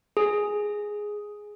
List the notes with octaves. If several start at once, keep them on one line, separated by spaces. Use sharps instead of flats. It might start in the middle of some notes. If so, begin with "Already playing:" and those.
G#4